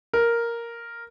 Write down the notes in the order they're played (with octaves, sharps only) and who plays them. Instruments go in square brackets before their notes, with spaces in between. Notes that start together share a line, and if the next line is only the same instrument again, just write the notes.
[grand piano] A#4